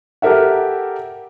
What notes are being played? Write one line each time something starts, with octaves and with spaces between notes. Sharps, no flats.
G4 A4 A#4 E5 F#5